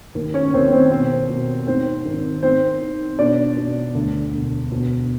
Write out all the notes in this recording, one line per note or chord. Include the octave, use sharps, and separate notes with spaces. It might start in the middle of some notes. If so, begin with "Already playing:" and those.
D#2
C#4 C#5
D#2 C4 C5
C4 C5
B2 C4 C5
B2
G#2 C4 C5
G#1
D#3 C4 C5
D#3
B2 D4 D5
B2
D2
E1
B2